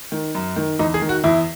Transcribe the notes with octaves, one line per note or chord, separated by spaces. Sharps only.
D#3
F#2
D#3
E2 D#4
G#4
D#3
F#4
E2 E4